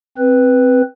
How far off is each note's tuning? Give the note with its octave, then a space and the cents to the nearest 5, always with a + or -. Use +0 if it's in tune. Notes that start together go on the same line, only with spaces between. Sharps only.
C4 +0 B4 +0